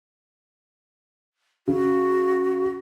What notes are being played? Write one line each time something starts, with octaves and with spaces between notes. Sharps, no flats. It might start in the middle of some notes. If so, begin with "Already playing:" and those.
C#3 F#4